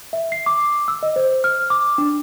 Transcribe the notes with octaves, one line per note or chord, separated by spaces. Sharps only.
E5
C7
D6
E6
D#5
C5
F6
D6
D4